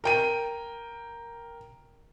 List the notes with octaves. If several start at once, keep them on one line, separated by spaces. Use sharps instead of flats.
A#4 G5 D#7